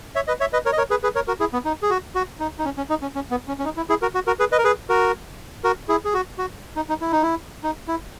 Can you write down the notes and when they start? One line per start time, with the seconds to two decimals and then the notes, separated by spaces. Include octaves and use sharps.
0.15 C#5 E5
0.28 B4 D#5
0.40 C#5 E5
0.53 B4 D#5
0.65 A#4 C#5
0.72 D#5
0.78 A#4 C#5
0.90 G#4 B4
1.03 G#4 B4
1.15 A#4 C#5
1.28 F#4 A#4
1.40 E4 G#4
1.53 B3
1.65 D#4
1.82 G#4
1.90 F#4
2.15 F#4
2.40 D#4
2.59 D#4
2.65 C#4
2.78 C#4
2.90 D#4
3.02 C#4
3.15 C#4
3.31 B3
3.48 C#4
3.59 C#4
3.65 D#4
3.77 E4
3.89 E4 G#4
4.02 F#4 A#4
4.15 F#4
4.27 F#4 A#4
4.40 G#4 B4
4.52 B4 D#5
4.58 A#4
4.64 G#4 B4
4.89 F#4 A#4
5.64 F#4 A#4
5.89 E4 G#4
6.05 G#4
6.14 F#4
6.38 F#4
6.76 D#4
6.89 D#4
7.01 E4
7.12 D#4
7.22 E4
7.63 D#4
7.88 E4